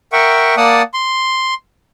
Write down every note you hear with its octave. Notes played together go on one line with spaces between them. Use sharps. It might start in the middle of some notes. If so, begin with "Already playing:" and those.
A#4 E5 F#5 G5 C#6
A#3 D5 F#5 A5 D#6
C6